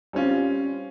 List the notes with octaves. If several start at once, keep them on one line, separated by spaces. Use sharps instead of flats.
G3 C4 C#4 F4